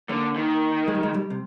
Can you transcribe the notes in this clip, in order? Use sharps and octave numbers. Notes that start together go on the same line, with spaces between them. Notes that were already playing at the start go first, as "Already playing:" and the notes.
D3 A#3
D#3
G#3
G3
G#3
G3
C3